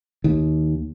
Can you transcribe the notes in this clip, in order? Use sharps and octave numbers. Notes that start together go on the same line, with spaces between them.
D#2